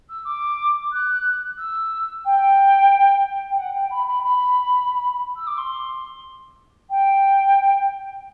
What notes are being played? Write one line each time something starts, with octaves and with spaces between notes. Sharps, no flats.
E6
D6
F#6
E6
G5
G5
F#5
G5
B5
B5
B5
E6
D6
C6
G5